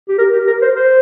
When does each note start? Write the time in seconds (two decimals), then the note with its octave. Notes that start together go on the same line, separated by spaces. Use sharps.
0.09 G4
0.19 A#4
0.33 G4
0.47 A#4
0.62 C5
0.76 C5